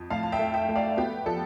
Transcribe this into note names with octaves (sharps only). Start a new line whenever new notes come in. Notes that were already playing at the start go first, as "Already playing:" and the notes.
Already playing: F2
A2 F5 A5
A5
E5 G5
A3
E5 G5
A3
D5 F5
B3 G4
F3 A4